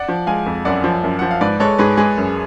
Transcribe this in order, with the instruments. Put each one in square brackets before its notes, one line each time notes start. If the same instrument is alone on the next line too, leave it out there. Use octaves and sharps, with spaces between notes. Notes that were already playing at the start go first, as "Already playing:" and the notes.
Already playing: [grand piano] D5 F#5
[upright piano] F3
[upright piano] G#3 [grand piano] F5 G#5
[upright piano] F2
[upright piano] F#2 [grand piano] D5 F#5
[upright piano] F3
F#2
[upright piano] F3 [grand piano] F#5
[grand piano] F5
[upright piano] G#2 [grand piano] B4 D5
[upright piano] G#3 [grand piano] A4 C#5
[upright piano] G#2 [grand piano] G#4 B4
[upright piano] G#3 [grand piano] G#4 B4
[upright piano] F#2